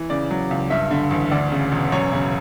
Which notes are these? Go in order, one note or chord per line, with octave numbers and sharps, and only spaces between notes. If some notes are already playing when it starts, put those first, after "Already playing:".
Already playing: E3
C#3 D5
F#3
C#2
G2 E5
D3
A1
D2 D5
C#3
E1
F#2 C#5
C#3